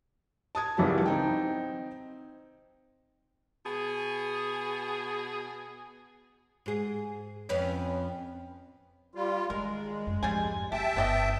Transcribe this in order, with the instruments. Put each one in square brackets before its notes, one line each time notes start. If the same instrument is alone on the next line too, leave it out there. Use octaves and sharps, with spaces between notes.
[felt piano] A5 D#6 G#6
G#1 C#2 E3 G3 A5
C4 D#4 G5
[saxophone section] B2 G#4
[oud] G#2 G#4
F2 B3 C#4
[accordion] G3 F4
[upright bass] D#3 [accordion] G#3 [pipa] A#4
[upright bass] F#2
[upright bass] F2 G#2 [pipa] G3 G#4 G#5
[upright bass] G#1 [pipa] G4 [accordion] E5 G5 A5
[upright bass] G1 [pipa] B3 D5 D#5